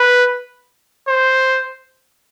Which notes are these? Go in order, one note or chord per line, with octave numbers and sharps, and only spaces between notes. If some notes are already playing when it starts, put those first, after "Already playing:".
Already playing: B4
C5